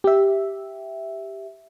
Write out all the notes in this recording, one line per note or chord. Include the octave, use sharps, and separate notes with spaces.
G4 E5